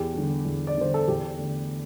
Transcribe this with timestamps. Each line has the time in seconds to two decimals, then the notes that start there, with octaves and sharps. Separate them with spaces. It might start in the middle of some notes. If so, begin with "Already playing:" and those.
Already playing: E2 G4
0.14 D3 G3
0.45 E2
0.67 D5
0.77 D3 G3 C5
0.94 A4
1.08 E2 G4
1.38 D3 A3